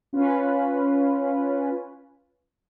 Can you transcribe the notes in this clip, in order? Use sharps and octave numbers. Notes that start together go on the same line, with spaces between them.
C#4 F4 B4